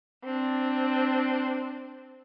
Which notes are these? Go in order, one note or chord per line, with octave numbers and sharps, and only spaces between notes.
C4 D4